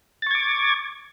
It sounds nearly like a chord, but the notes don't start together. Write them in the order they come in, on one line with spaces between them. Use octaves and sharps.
A6 C#6 G#6 D6